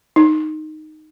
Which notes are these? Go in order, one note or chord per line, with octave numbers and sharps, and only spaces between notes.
D#4